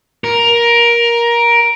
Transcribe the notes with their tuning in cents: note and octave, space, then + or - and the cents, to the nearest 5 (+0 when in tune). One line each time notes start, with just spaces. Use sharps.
A#4 +15